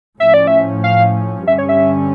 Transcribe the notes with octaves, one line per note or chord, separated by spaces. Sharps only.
A2 F3 C#4 E5
D5
E5
F5
G2 D3 G3 C#4 E5
C#5
E5